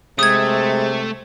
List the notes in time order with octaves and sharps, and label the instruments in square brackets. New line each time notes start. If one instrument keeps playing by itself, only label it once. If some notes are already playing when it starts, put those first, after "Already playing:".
[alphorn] C3 [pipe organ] G#3 [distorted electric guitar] A3 [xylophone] D#6 G#6